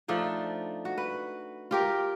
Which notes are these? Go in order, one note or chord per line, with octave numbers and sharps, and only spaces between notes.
F3 A3 D4 D#4
F#4
B4
F4 G4 A#4